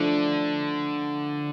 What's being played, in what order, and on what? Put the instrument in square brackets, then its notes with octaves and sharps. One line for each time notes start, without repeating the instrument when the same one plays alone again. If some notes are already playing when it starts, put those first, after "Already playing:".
Already playing: [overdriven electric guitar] D3 [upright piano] F3 A3 D4